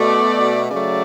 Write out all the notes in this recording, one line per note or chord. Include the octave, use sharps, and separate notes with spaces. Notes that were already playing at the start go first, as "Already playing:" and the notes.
Already playing: B2 A3 D5
C#3 F#3 A3 D5